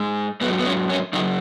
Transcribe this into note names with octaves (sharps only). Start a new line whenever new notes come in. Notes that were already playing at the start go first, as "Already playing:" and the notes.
Already playing: G#2 G#3
G#2 F#3 B3
B3
C#4
C#4
F#2 C#3 F#3 D#4